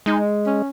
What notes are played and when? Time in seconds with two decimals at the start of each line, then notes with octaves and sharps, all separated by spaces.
0.06 G#3 D#4
0.46 C#4